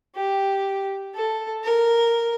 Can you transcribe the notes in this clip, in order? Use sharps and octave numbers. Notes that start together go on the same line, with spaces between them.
G4
A4
A#4